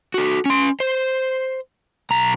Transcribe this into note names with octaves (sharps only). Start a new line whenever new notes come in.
F#4 A4
C#4 C6
C5
B1 A#5